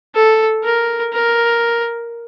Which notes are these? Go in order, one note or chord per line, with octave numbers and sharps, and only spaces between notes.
A4
A#4
A#4